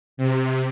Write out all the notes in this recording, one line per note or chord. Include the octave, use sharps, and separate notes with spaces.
C3